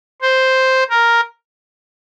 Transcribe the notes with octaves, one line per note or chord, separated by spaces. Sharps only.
C5
A#4